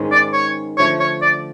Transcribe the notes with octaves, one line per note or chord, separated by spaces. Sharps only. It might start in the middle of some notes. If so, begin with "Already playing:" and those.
Already playing: G#2 D#3 G#3 C#4
D5
C#5
D3 F3 A3 C#5
C#5
D5